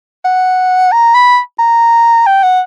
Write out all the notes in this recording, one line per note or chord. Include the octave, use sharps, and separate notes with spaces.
F#5
A#5
B5
A#5
G5
F#5